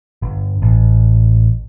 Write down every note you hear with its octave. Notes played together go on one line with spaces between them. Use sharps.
G1
A1